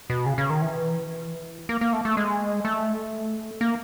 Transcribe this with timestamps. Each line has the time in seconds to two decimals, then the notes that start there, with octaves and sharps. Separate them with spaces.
0.10 B2
0.26 C#3
0.38 C#3
0.50 D#3
0.61 E3
1.69 A#3
1.81 A#3
1.93 A3
2.05 A3
2.17 G#3
2.65 A3
3.61 A#3